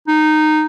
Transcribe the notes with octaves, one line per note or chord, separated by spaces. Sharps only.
D#4